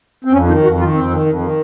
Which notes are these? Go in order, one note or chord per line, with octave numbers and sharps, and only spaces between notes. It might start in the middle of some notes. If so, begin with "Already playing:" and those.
C4
F2 C#4
D#3 D#4
F2 F#4
D#3 F4
F2 C4
D#3
F2
D#3